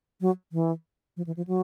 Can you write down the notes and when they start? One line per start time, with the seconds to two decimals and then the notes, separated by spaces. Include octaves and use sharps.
0.21 F#3
0.52 E3
1.17 F3
1.26 E3
1.37 F3
1.47 F#3